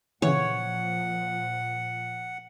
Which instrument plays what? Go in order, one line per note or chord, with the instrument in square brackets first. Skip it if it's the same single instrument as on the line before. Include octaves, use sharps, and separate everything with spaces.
[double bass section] A#2 F3 [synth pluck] C#3 E3 [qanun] C#5 [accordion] F#5